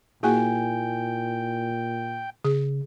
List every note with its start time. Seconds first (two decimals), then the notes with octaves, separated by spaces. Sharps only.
0.23 A#2 A#3 E4 F#4 G#4 G5 G#5
2.45 C#3 G#4